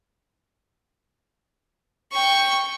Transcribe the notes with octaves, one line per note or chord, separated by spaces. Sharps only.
G5 C#6